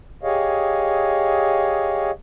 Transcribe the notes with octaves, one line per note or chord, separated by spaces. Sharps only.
G4 G#4 C#5 D#5 F5